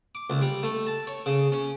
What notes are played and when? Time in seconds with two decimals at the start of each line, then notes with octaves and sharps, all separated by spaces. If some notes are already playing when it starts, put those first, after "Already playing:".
0.15 D6
0.30 C#2
0.41 G3
0.63 A3
0.87 A5
1.07 C#5
1.26 C#3
1.52 C#4